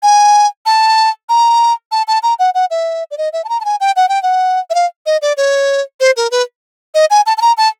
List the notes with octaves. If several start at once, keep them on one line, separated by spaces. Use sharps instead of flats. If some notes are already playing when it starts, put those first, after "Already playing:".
G#5
A5
A#5
A5
A5
A#5
F#5
F#5
E5
D5
D#5
E5
A5
A#5
A5
G#5
G5
F#5
G5
F#5
E5
F5
D#5
D5
C#5
C5
A#4
B4
D#5
G#5
A5
A5
A#5
A5